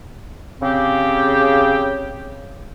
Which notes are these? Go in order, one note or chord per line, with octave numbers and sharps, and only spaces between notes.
C#3 C4 G4